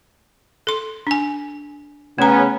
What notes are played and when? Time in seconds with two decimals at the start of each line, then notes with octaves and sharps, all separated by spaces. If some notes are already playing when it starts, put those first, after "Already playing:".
0.67 A4 C6
1.07 D4 G#5
2.19 C#3 A3 B3 C#4 A#5